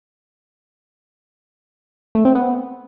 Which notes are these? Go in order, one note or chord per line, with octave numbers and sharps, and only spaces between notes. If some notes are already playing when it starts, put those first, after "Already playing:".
A3
C4
B3